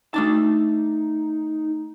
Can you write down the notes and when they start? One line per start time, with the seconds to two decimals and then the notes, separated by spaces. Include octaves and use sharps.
0.14 A3 D4 D#4 A5